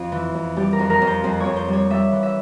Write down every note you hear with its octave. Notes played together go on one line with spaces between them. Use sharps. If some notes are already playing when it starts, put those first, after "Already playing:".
Already playing: F2 F4
E3
F2
G3 G4
A#4
F2
A#4
F2
C5
F2
F2 C#5
C5
G3 C#5
G3 E5
E3
E5